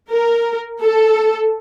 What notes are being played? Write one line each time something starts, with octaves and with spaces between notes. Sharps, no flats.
A#4
A4